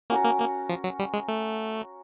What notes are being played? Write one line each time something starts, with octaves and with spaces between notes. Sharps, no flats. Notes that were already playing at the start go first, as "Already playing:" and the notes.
A#3 C#4 F#4 A#4
A#3
A#3
F3
F#3
G3
G#3
A3